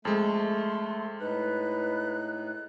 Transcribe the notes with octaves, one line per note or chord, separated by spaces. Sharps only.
F2 G#3 A3 C6
A2 D#4 B4 F#6